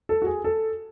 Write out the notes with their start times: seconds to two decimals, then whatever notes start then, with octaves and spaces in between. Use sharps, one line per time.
0.09 A4
0.22 F#4
0.26 G#4
0.44 A4